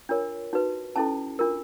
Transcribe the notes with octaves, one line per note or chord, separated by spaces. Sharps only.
D4 F4 A#4 C#5
D#4 F#4 B4
C#4 E4 A4 A5
D4 F4 A#4